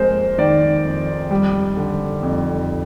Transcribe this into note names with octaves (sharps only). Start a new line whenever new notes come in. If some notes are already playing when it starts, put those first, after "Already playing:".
Already playing: F2 G#3 A#4 C5
D#3 D5
F2
G3
D3
F2